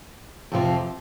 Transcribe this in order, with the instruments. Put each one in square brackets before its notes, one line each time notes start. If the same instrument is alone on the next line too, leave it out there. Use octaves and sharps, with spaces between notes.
[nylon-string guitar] F2 C3 F3